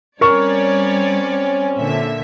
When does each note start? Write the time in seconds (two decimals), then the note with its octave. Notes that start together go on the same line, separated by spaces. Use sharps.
0.21 G3 C4 C#4 A#4 C#5 D5 C#6
1.76 A#2 D3 E5